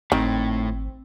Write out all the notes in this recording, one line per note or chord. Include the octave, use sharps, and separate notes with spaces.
G#1 A2 D#3 C4